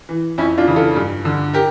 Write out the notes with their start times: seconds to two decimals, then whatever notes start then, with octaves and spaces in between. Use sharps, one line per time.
0.09 E3
0.38 F2 C#4 E4
0.58 D4 F4
0.67 C#3 E3
0.76 F4 A4
0.96 G2
1.25 D3
1.54 G4 A#4